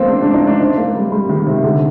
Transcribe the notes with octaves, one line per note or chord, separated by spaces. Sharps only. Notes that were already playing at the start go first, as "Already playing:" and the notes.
Already playing: A#3 C4
D4
D4
D#4
D4
C4
A#3
G3
G3
D#3
C3
D3